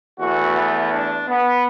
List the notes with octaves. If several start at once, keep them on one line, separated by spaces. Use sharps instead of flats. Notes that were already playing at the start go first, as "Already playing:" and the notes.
E2 E3 A3 F#4
B3
D4
B3